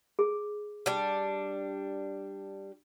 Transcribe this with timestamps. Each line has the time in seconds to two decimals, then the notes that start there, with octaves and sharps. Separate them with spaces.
0.19 G#4
0.86 G3 D4